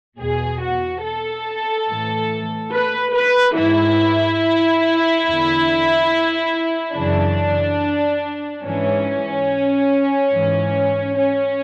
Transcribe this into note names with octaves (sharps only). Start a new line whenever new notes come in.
E2 B2 G#4
F#4
A4
A2 E3
B4
B4
G#2 E3 E4
E2 D3
F#2 C#3 E3 D4
G#2 E3 C#4
G#2 E3
C#4